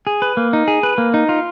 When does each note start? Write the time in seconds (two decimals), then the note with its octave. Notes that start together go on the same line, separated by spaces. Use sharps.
0.07 G#4
0.22 B4
0.37 A#3
0.53 D#4
0.68 G#4
0.83 B4
0.98 A#3
1.14 D#4
1.29 F4